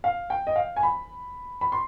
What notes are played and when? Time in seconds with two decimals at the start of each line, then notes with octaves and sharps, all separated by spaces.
0.04 F5
0.30 G5
0.47 D#5
0.56 F5
0.76 G#5
0.83 B5
1.61 B5
1.72 C6